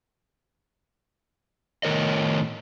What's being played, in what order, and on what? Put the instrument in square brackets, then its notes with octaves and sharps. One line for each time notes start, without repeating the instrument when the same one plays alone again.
[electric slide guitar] A2 D#3 C4 A#4 C#5 D#5